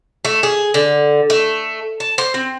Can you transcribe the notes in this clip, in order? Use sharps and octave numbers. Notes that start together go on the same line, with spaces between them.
A3
G#4
D3
A3
A5
C5
C4